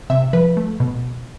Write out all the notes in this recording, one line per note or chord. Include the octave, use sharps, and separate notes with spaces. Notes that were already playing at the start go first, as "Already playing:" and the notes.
C3 E5
F3 B4
A3
B2